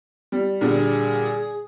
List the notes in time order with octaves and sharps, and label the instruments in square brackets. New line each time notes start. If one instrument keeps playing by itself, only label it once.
[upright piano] G3
[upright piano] A#2 D3 G3 [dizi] G#4